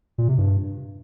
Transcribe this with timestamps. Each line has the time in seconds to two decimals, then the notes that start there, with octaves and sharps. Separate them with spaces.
0.18 A#2
0.28 C3
0.38 G2